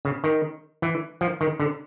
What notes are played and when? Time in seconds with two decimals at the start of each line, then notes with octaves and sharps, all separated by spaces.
0.05 C#3
0.24 D#3
0.82 E3
1.21 F3
1.41 D#3
1.60 D3